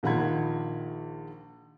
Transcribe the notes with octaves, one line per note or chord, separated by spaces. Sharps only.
A#1 D#3 F4 F#5 B5 G#6